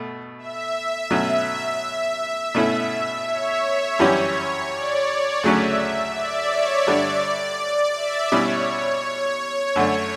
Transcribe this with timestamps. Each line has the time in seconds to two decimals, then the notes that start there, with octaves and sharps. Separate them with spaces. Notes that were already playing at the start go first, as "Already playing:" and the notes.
Already playing: B2 A3
0.39 E5
1.10 B2 F#3 A3 C#4
2.55 B2 A3 C#4 E4 A4
3.27 C#5
3.99 F#2 E3 G3 C#4 G4
4.71 D5
5.08 D5
5.43 D2 C#3 F#3 A3 C#4 E5
6.15 D5
6.51 C#5
6.87 G2 D3 G3 D4 A4 D5
7.60 D5
7.96 E5
8.32 B2 G3 C#4 E4 C#5
9.76 F#2 D3 A3 D4 C#5